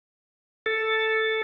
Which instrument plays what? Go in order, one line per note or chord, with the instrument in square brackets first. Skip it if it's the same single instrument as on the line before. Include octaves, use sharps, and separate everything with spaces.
[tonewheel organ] A4